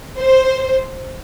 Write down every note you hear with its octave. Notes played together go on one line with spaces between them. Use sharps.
C5